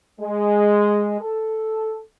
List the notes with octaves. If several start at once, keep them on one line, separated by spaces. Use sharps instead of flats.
G#3
A4